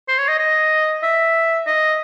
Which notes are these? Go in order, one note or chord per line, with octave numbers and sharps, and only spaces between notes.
C5
C#5
D#5
D#5
E5
D#5